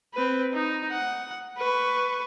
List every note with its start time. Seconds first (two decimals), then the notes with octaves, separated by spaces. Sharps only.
0.14 C4 B4
0.53 D#4
0.91 F#5
1.58 B4 C#6